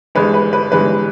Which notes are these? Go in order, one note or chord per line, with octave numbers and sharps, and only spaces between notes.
G1 G2 E3 G#3 B4
B4
B4
G1 G2 E3 G#3 B4